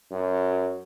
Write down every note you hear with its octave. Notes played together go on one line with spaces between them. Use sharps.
F#2